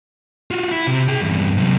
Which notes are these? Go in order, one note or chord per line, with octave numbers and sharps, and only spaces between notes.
F4 F#4
E4
C3
G#4 G5
E2 G2
C3 F#3